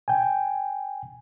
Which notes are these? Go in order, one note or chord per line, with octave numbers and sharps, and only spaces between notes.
G5 G#5